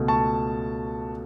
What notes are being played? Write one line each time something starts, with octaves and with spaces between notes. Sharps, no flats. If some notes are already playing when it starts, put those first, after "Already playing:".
Already playing: C#2 B2 A3
A5 C#6